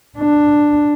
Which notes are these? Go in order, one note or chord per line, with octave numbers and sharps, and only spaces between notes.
D4